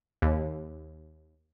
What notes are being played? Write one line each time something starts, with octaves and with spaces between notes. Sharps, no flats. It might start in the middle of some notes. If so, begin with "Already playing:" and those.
D#2